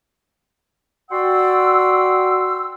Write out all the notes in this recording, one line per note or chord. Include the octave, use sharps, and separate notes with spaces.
F#4 D5 F#5 G5 C6 E6